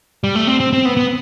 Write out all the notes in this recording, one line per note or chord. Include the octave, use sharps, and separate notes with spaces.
G3
A3
C4
C4
C4
B3
B3